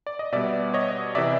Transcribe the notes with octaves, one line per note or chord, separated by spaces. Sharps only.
D5
D#5
B2 G3 B3 D5 E5
C#5 D#5
C3 E3 D5 E5